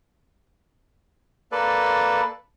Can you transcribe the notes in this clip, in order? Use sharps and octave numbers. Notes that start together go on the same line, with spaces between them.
A#3 A4 B4 D5